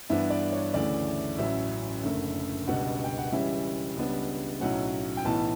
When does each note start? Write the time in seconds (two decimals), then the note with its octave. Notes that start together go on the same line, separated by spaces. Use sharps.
0.10 G2 E3 B3 D4 E5
0.30 D5
0.52 C#5
0.74 D2 C#3 E3 A3 D5
1.38 A1 A2 F#3 C#4 E5
2.03 F#1 F#2 D3 A3
2.67 C#2 B2 G3 D4 F#5
3.04 G5
3.18 F#5
3.32 C#2 C#3 E3 G3 C#4 E5
3.96 C#2 C#3 G3 B3 D4
4.60 B1 A2 F#3 C#4 F#5
5.17 G5
5.25 B1 A2 E3 B3 A5